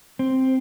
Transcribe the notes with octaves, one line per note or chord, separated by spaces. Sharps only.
C4